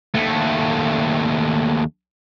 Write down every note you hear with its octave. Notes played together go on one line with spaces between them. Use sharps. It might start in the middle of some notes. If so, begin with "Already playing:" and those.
D#2 A3